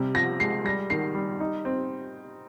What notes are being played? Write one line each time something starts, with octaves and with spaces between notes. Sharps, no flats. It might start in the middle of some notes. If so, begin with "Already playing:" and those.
Already playing: C3 G3
F3 A#6
G#3 C7
G3 A#6
D#3 C7
G3
D#4
C4